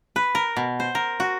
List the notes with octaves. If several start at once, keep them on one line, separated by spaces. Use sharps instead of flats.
B4
A#4
B2
C5
A#4
F#4